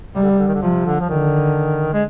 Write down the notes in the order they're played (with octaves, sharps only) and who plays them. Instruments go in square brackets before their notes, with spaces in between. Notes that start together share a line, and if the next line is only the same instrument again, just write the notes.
[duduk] C3 [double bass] G3
[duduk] D3
C3
D3
D#3
D3
[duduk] C3 [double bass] F3
[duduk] D3
F3
[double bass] D3 [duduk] D#3
[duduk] G#3